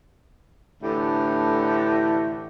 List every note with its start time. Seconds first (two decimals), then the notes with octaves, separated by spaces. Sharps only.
0.83 A2 D3 E3 A3 D4 G4